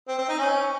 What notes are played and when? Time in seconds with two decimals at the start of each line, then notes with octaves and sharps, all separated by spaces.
0.08 C4
0.18 C4
0.29 D#4
0.39 C#4